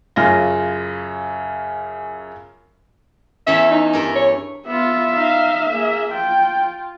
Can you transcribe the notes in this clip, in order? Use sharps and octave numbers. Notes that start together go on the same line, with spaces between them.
F#2 C#3 F4 A#6
E2 E3 C#4 E5
D#4
G2 A#4 E5
C#5
B3 F4 E5
D#4 F5
A#3 G#4
F4 G5